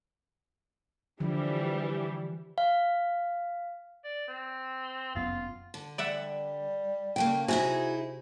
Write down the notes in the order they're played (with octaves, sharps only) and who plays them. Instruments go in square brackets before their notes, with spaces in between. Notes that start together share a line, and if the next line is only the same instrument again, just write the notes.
[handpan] D3 F3 [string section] E3 G3
[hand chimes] F5
[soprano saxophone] D5
C4
[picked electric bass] F1 F#2 B3 [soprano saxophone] F4
[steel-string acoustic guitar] D3
[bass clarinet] G3 [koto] D5 E5 F#5
[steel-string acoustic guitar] C#3 A3 A#3 [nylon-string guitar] G5
[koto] C3 [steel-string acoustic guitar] D#4 E4 G#4 [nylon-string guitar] F#4 G#5